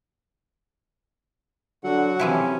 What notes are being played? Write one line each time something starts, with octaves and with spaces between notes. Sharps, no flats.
D3 F#3 F#4 F#5
C3 E3 F3 C#4 E4